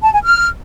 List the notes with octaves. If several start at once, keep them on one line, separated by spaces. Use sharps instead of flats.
A5
G#5
F6